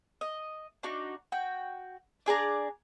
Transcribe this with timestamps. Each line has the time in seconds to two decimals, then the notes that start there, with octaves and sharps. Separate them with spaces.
0.21 D#5
0.83 D4 D#4 F#4
1.32 F#4 G5
2.26 D4 G#4 D5 A#5